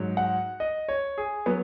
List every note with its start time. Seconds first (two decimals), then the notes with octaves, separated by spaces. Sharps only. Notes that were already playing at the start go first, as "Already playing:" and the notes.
Already playing: G#2 F#3
0.17 F#5
0.60 D#5
0.88 C#5
1.18 G#4
1.46 F#3 B3